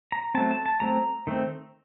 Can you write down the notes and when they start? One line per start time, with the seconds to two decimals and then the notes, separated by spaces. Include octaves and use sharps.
0.12 A#5
0.34 F#3 A3 C4 A5
0.51 A5
0.66 A5
0.80 F#3 A3 C4 A#5
1.27 D#3 A3 C4